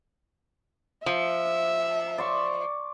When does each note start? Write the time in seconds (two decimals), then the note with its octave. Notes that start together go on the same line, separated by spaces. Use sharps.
1.06 F3 E5
2.18 D5 C6 C#6